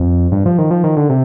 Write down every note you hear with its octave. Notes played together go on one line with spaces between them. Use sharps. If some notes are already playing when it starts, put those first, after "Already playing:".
Already playing: F2
G2
F3
D#3
F3
D#3
D3
C3